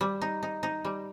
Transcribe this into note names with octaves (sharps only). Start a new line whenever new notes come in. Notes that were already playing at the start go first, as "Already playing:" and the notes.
G3
D#4
D#4
D#4
G3